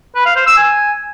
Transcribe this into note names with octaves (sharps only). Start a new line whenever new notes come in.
B4
F5
C5
E6
G#5